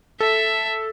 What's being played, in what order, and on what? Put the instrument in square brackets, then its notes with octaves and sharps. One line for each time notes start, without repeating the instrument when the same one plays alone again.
[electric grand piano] A4 [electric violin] E5